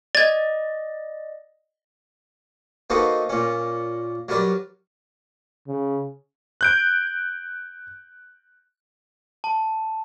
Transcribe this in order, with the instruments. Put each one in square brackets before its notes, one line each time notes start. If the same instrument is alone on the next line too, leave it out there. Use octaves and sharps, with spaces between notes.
[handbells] D5 D#5 [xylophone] G#6 A6
[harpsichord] A#3 C4 D#4 F#4 A4 B4
A#2 C#4
F#3 G3 A#4 B4 D5
[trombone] C#3
[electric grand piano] F#6 G6 D7
[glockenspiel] A5